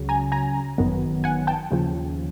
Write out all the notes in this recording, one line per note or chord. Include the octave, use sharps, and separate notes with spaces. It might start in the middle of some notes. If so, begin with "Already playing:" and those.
Already playing: C#2 C#3 F#3
G#5 A#5
G#5 A#5
G1 F#2 D#3 F#3 B3
F#5 G#5
G5 A5
D#2 C#3 F3